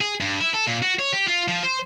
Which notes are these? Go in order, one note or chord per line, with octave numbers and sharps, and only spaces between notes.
G#4
G2
E4
A4
A#2
F#4
C#5
G4
F4
F3
C5